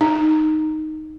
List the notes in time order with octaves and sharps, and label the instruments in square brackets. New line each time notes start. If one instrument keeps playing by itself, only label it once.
[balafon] D#4